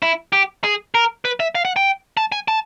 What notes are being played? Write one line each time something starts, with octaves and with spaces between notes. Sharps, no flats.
E4
G4
G#4
A#4
B4
E5
F5
F#5
G5
A5
G#5
A5